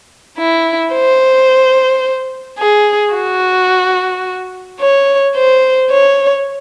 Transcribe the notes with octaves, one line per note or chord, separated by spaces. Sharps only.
E4
C5
G#4
F#4
C#5
C5
C#5